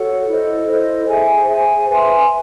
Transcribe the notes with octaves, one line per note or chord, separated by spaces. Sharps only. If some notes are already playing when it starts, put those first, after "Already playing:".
Already playing: F#4 A4 C#5 F#5
E4 A4 C5 D#5
E4 A4 C5 D#5
G#4 C5 E5 G#5
G#4 C5 E5 G#5
B4 E5 G#5 C6